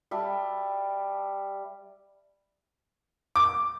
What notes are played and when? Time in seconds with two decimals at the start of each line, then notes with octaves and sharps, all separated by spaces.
0.11 G3 E5 A5
3.36 D6